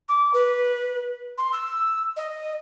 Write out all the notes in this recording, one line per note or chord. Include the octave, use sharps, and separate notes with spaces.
D6
B4
C6
E6
D#5